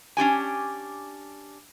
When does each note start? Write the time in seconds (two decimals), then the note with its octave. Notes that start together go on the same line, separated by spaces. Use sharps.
0.17 C#4 D4 G4 G#5